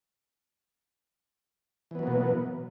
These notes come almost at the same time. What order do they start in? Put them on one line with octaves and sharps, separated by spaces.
E3 B3 F#3 A#3 B2